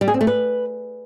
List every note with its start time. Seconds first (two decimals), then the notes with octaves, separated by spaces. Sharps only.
0.01 G3
0.08 G#4
0.14 C4
0.21 A3
0.27 B4